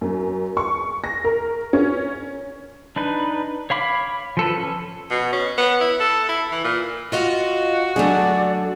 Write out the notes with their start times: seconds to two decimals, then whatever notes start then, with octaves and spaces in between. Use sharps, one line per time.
0.01 F#2
0.57 C#6
1.04 A#6
1.24 A#4
1.73 C#4
2.96 D4 D#4 B4
3.70 C#5 F5 B5 D6
4.37 F3 A4 B4
4.57 C#4
5.10 B2
5.33 C#4
5.58 B3
5.81 E4
6.00 A4
6.29 E4
6.51 E3
6.64 A#2
7.12 F4 F#4 D#5 F5
7.96 D3 F#3 A3 D4 G#4 D5